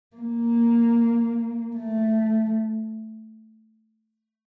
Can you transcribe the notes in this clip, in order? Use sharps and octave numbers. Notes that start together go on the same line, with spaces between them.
A#3
A3